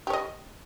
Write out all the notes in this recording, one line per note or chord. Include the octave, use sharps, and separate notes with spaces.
G4 C#5 D#5